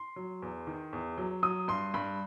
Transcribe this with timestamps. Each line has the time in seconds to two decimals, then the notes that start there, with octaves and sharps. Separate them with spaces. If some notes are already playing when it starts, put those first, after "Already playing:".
Already playing: C6
0.16 F#3
0.42 E2
0.67 D#3
0.93 E2
1.18 F#3
1.43 F#3 D#6
1.68 G2 C6
1.94 G2 B5